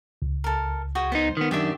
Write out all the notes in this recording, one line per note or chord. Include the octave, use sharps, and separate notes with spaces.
C#2
A4 A#4
F#4 G#4 G5
B3 D#4 C5
D#3 B3
F#2 D#3 D4 G4 D5 E5